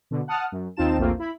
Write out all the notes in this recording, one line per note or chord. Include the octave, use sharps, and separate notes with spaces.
B2 D3
F#5 A5 D#6 F6
F#2
D#2 C4 D#4 F4 A5 E7
A#1 E2 A3 A#3 C4 F4
E4 B5